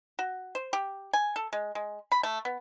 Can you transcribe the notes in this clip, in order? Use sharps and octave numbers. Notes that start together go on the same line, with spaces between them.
F#4
C5
G4
G#5
A4
G#3
G#3
B5
A3
B3